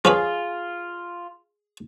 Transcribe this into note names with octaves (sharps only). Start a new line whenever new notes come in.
F3 C#4 F4 G#4 B4